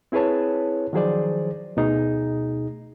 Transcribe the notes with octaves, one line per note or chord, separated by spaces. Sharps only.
C4 E4 G#4 B4 C#5 A5
D#3 F3 F#3 G#4 C5 D5
D2 B2 A3 D#4 G#4